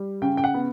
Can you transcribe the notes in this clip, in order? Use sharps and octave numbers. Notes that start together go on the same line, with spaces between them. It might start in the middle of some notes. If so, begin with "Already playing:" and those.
Already playing: G3
C#3 G5
G5
F#5
B3